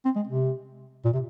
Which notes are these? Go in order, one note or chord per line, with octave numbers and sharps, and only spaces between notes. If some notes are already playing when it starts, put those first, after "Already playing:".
C4
G#3
C3
A#2
C3